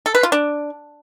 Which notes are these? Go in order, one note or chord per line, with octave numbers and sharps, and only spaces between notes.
A4
B4
F4
D4